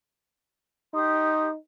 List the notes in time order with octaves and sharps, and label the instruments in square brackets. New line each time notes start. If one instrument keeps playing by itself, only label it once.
[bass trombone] D#4 [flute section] G4 C6 D#6